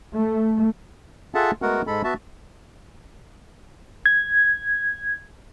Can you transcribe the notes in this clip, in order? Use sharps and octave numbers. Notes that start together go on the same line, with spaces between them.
A3
F4 G#4 A4 E5 F#5 A5
G#3 A3 B3 F#4 A#4 F#5
G#2 G#3 A4 B5
B3 F#4 E5 A5
G#6